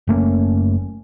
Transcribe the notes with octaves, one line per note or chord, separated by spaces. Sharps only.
F#1 A3 A#3 C#4